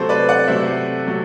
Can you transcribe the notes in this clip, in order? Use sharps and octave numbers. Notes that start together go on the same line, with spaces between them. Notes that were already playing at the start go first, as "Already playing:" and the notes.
Already playing: C3 F#3 A3 A4 C5
B4 D5
D5 F#5
C3 F#3 A3 C5 E5
C3 F#3 A3